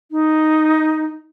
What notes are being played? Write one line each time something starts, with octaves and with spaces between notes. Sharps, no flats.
D#4